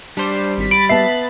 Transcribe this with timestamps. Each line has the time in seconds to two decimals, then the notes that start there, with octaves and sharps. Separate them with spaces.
0.17 G3 D4 C5
0.57 G#1 B6
0.71 B5 A6 D7
0.89 B3 E5 A5 C7